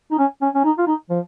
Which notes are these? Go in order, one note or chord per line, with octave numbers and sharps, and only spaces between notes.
D#4
C#4
C#4
C#4
D#4
F4
D#4
F3